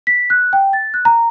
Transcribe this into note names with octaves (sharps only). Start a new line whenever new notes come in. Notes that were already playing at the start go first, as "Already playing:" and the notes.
B6
F#6
G5
A6
F#6
A#5